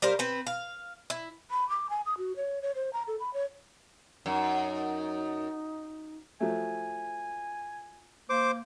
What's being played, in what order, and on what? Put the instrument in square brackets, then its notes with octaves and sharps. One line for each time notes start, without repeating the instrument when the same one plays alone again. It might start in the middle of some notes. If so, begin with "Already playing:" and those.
[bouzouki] G3 A#4 C5 F5
C4 B4
F5
E4
[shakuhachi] B5
D6
G#5
D#6
F#4
C#5
C#5
C5
A#5
A4
B5
C#5
[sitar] F#2 [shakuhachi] D#4
[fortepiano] F3 F#3 A3 [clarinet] G#5
[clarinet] A#3 [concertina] C5 D6